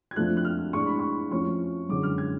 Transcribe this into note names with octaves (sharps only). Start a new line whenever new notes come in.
G#6
F2 F3 A3 D4 F#6
F#6
F6
A2 G#3 D4 C#6
B5
C#6
F2 F3 A3 C#4 C#6
F#2 D3 G#3 C#4 D6
F6
G#6